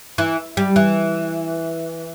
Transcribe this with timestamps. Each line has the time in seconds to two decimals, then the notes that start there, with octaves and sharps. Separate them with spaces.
0.18 E3
0.57 G3
0.76 E3